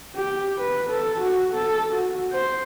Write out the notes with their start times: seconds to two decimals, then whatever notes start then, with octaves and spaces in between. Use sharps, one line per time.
0.16 G4
0.58 B4
0.90 A4
1.21 F#4
1.54 A4
1.94 F#4
2.33 C5